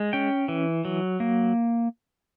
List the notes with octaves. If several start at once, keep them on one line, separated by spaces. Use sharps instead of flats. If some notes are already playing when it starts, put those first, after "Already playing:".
Already playing: G#3
C#4 G5
E3
F#3
A#3